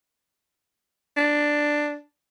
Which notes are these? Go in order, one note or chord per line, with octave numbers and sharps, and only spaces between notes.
D4